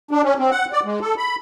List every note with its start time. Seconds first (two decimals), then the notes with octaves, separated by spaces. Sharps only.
0.11 D4
0.24 C#4
0.39 C4
0.51 F#5
0.73 D5
0.85 G#3
1.01 A4
1.18 B5